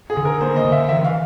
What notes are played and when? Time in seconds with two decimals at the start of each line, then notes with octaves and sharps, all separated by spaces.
0.10 G#4
0.17 D3
0.25 A#4
0.41 A#3 C5
0.56 D#5
0.65 D3
0.72 E5
0.89 E3 E5
1.04 F5